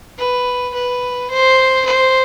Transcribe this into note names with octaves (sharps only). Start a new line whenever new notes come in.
B4
B4
C5
C5